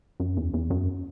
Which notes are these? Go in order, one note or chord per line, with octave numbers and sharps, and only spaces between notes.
F#2
E2
E2
F#2